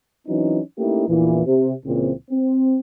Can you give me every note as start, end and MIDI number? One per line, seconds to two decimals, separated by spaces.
0.27 0.60 52
0.27 0.60 54
0.27 0.60 60
0.27 0.60 61
0.27 0.60 63
0.78 1.04 57
0.78 1.04 58
0.78 1.04 61
0.78 1.04 63
0.78 1.04 64
0.78 1.04 67
1.08 1.41 34
1.08 1.41 40
1.08 1.41 46
1.08 1.41 52
1.46 1.72 48
1.85 2.12 37
1.85 2.12 46
1.85 2.12 49
1.85 2.12 52
1.85 2.12 60
2.30 2.79 60